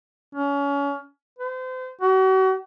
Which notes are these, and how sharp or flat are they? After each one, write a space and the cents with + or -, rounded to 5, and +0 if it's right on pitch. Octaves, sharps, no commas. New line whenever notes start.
C#4 +30
C5 -35
F#4 +40